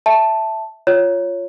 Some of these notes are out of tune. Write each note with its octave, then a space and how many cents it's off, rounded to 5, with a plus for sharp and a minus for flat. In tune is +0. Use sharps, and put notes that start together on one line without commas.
E5 +0 A5 +0
F4 +0 C#5 +0